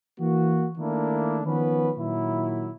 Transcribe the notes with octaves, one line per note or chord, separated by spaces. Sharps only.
E3 A#3 F#4
D#3 A3 A#3 D4 E4
D#3 F3 B3 C#4 B4
A#2 D#3 F#3 E4